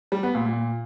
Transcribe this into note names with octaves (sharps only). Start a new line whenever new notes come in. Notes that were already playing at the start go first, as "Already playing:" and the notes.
G3
B3
A#2
A#2